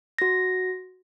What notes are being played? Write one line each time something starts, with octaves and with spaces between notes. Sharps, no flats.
F#4 A#6